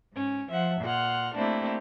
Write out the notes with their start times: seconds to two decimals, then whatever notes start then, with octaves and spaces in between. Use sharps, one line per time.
0.14 G#2 C#4
0.48 F3 E5 F#5
0.82 A#2 F#5 C6 F6
1.36 A3 A#3 C4 D4 E4 G4